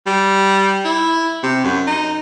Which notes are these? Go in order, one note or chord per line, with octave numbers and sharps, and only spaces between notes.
G3
E4
C3
F#2
D#4